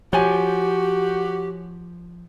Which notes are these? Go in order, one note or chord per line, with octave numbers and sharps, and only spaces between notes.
F3 F#4 G4 C#5 G#5